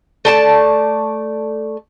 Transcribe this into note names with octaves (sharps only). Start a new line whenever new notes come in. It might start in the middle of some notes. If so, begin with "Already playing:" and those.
A3 D5 A5